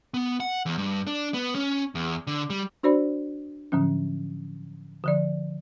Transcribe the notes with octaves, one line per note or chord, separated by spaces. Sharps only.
B3
F#5
E2
G2
D4
B3
C#4
E2
D3
G3
D4 F#4 C5 D5 B5
A2 D3 F3 F#3 C#4
D3 F3 D5